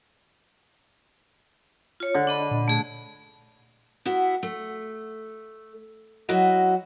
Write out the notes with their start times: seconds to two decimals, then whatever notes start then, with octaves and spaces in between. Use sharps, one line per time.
2.00 F4 C#5
2.14 D3
2.27 D4 D#5 B5
2.51 A#2
2.68 A3 G#4
4.05 B3 E4 F#4
4.43 A3
6.29 F#3 E4 F#4 D#5